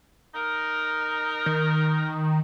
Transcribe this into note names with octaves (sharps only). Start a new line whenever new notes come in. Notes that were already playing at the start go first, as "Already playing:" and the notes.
D#4 A#4
D#3